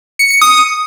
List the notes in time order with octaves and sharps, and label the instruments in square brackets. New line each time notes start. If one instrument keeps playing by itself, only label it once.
[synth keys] C#7
C#7
D#6